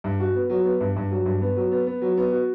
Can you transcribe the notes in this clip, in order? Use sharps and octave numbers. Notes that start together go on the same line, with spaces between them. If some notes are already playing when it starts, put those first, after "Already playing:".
G2
F#4
B3
F#3
B3
G2
G2
F#3
G2
B3
F#3
B3
B3
F#3
B3
F#4